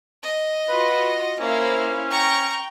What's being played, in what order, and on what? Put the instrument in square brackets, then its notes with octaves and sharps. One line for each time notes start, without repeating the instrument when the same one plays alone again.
[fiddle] D#5
[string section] F4 F#4 [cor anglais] B4
[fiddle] A#3 [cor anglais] C#4 [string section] E4 C5 F5
[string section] G5 [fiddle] A#5 C#6